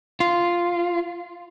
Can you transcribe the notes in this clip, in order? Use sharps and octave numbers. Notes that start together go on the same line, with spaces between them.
F4